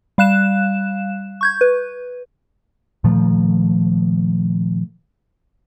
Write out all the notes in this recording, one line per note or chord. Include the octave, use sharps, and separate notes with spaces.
G3 F5 F#6 E7
C#6 G6 G#6
B4
A#2 D#3 F3 A3